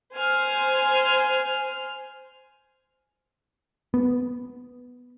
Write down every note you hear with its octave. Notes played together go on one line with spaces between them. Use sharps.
C5 G#5 F6
B3